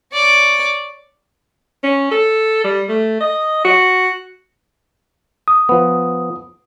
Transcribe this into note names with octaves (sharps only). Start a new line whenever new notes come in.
C#5 D5
C#4
A4
G3
A3
D#5
F#4
D#6
F3 B3